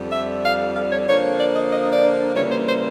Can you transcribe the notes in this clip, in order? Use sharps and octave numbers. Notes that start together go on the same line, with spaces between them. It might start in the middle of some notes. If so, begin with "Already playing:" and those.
Already playing: F2 D3 G3
E5
F5
F5
C#5
D3 F3 A#3 D4 C#5
D5
D#5
D#5
D#5
D5
C#3 E3 G3 A#3 C#5
C5
C5